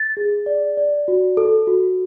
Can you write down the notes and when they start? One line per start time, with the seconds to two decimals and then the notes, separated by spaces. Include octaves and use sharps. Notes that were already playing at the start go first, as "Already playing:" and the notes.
Already playing: A6
0.17 G#4
0.46 D5
0.77 D5
1.08 F#4
1.37 A4
1.67 F#4